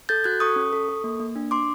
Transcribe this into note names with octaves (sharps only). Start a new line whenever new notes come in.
A4 G6 A6
F#4 F#6 G#6
A4 C#6 D#6
C#4
A4
A4
A#3
A#3
D4
D4 C6 D6